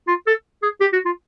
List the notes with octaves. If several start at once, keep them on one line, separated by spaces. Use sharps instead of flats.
F4
A4
G#4
G4
F#4
F4